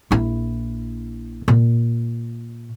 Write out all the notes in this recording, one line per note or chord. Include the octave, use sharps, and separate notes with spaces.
A#1 E4
A#2